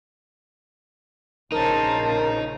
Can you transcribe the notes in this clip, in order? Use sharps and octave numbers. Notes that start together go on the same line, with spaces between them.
A#1 C#3 D#4 A#4 C5 A5